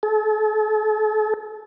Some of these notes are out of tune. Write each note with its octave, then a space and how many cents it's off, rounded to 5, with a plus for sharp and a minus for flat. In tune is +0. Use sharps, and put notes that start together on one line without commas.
A4 -40